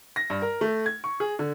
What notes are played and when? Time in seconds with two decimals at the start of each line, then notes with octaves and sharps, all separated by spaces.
0.16 A#6
0.30 G2
0.42 A#4
0.61 A3
0.86 G#6
1.04 C#6
1.20 G#4
1.39 D3